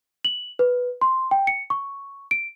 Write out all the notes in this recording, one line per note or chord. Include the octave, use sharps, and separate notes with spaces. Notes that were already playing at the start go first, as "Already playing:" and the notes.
F#7
B4
C6
G5
C#7
C#6
D7